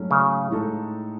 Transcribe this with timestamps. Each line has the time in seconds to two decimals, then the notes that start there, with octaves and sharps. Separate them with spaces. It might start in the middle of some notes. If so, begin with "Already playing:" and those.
Already playing: G#2 F#3 A3 C#4
0.11 C#3
0.49 A2 G#3 D#4 A4